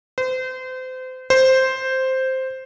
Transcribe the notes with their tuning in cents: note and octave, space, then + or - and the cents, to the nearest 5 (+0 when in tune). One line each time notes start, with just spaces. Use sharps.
C5 -30
C5 +0